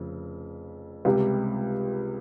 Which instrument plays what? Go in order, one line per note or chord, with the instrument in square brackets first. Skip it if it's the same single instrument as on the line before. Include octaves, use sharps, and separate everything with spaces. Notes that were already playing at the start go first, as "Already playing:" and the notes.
Already playing: [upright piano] F1 F2 C#3
C#2 C3 G3